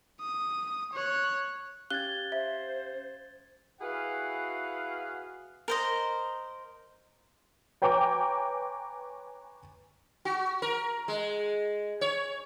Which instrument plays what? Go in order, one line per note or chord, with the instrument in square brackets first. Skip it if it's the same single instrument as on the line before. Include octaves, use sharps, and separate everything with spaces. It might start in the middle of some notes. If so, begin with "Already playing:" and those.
[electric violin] D#6
C#5 F#6
[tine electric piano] C#4 G4 F5 [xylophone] F#6 [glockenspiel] G#6 A6 G7
[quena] C5 [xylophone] E5
[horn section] E4 F#4 G#4 B4 F5 F#5
[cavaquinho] A#4 C5 D#5
[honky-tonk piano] B4 C#5 G5 G#5 A#5 D6
[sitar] F#4
A#4
G#3
C#5